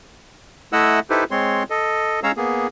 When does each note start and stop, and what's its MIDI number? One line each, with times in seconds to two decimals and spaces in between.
0.73 1.00 57
0.73 1.00 64
0.73 1.00 75
0.73 1.00 78
0.73 1.00 88
1.10 1.24 63
1.10 1.24 64
1.10 1.24 67
1.10 1.24 69
1.10 1.24 71
1.10 1.24 72
1.31 1.63 56
1.31 1.63 60
1.31 1.63 73
1.31 1.63 84
1.70 2.20 69
1.70 2.20 75
2.23 2.32 56
2.23 2.32 61
2.23 2.32 73
2.23 2.32 77
2.23 2.32 82
2.23 2.32 88
2.37 2.67 58
2.37 2.67 59
2.37 2.67 68